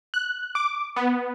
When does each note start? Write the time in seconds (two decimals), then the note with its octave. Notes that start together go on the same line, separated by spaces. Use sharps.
0.14 F#6
0.55 D6
0.96 B3